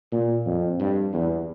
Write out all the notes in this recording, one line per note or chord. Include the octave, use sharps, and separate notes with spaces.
A#2
F2
G2
E2